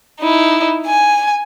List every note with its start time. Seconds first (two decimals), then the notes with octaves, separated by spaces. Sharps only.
0.20 D#4 E4
0.87 G#5